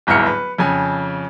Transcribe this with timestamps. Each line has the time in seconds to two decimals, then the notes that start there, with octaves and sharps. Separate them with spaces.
0.07 D1 G1 G#2 E4 F6 C#7
0.27 B4
0.58 F2 C#3 G#5